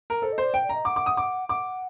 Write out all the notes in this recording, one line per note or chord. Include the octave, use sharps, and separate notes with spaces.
A#4
A4 C5
D#5
C5
D5
G5
D5
D#5 A#5
F#5 D6
D6
D#6
D6
F#5 D6